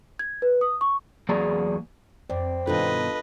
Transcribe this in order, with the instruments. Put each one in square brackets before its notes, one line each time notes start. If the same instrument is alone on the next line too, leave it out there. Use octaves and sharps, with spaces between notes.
[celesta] G#6
B4
D#6
C#6
[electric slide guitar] E2 F#3 A#3 G#4 D5 A#5
[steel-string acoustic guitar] F2 [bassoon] C4 [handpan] D5
[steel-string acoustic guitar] G2 B2 D#3 [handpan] D4 F4 A4 [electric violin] B4 D#5